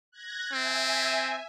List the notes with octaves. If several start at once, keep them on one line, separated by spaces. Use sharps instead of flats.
F#6 G#6 A#6
C4 E5 G#5